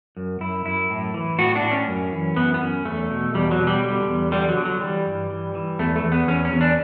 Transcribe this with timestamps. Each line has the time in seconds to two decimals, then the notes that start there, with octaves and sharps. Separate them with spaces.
0.17 F#2
0.41 F#2 E4
0.66 F#2 E4
0.90 A2
1.14 E3
1.39 A2 F#4
1.56 D4
1.63 A2
1.71 C#4
1.88 F#2
2.12 E3
2.36 F#2 B3
2.54 B3
2.61 F#2 C#4
2.85 E2 A3
3.10 B2
3.35 E2 G3
3.51 F#3
3.59 B2
3.67 G3
3.84 D3
4.08 E2
4.32 D3 G3
4.49 F#3
4.57 D3
4.65 F#3
4.81 E3 G3
5.06 G2
5.30 E3
5.55 E3
5.79 E2 A3
5.96 A3
6.04 E2
6.12 B3
6.28 E2 C#4
6.45 C#4
6.53 E2
6.61 D4